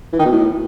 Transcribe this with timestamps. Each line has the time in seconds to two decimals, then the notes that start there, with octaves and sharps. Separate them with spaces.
0.13 E3
0.19 D#3
0.26 B2
0.32 A2